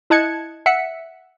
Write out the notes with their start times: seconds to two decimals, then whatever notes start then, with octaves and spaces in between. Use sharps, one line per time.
0.10 E4 D#5 A5 F#6 G#6 C#7
0.66 E5 F#5 B6 C#7